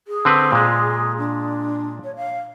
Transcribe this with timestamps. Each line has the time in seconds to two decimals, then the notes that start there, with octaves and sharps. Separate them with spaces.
0.08 G#4
0.25 D3 C4 B4
0.52 A#2 G#3
1.18 D4
2.04 C#5
2.16 F5